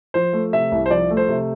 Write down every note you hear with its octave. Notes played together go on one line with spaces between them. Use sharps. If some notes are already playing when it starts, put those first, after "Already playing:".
F3 C5
A3
C3 E5
C2
C5
F3 D5
A3
C5
C3